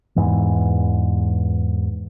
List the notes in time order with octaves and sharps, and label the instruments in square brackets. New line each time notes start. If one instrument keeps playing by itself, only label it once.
[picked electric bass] E2 G#2 E3